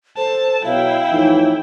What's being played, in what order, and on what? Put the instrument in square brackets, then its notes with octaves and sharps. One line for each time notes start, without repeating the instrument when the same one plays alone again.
[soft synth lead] A4 [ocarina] C5 [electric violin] A5
[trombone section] B2 F#3 [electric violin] E4 G5 [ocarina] F5
[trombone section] F2 A2 E3 [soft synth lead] D#4